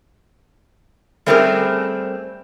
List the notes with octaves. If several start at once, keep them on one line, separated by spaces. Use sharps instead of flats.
G3 A3 C4 C#4 G#4 A#4